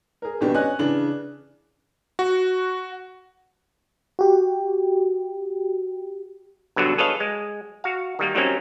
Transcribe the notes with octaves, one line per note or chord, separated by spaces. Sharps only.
G#4 A#4
G#1 B2 B3 D4 G4
C#4 D#5 G#5 F#6
C#3 E3 D4 F#7
F#4
F#4 G4
G2 B2 D3 F#3
G#4 A4 B4 C#5 D#5 F5
G#3
F#4 F5
D#3 G3 A#3
D#3 F#3 G3 A#3 C4 C#4